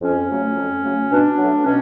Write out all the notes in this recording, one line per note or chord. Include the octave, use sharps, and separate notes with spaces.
F2 C#4
C#3 F#3 A3
F2
C#3 F#3 A3
B2 D4
F#3 A3
B2 C#4